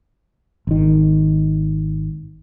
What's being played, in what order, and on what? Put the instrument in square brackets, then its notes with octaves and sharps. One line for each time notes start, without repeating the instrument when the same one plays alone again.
[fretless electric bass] G#1 D#3